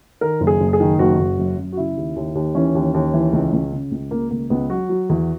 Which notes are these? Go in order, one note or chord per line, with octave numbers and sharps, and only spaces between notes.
D#3 A#4
F#1
G#4
F#1
G#4
D#3
F#1 F#4
F#1
F#2
F#2
F#4
C#3 E4
D#2
D#2
D#2
E3 C#4
D#2
D#2
E3
C#2
C#2
C#3
C#2
C#2 A#3
C#2 A#3
C#2 B3
F#3 F#4
F#3
E2